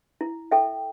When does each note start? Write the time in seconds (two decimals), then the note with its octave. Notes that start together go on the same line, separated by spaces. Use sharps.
0.21 E4
0.51 A4 E5 G5